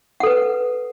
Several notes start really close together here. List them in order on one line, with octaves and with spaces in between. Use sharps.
F#5 A4 B4